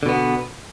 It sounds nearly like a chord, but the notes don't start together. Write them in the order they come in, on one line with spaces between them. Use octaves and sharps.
D3 B2 B3